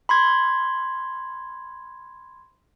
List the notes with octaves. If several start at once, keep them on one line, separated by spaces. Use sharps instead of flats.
B5 C6 G#6